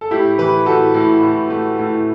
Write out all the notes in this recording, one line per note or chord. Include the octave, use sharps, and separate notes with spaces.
A4
A2 E4 G4
E3 G4 B4
A2 F#4 A4
A2
A2
A3
A2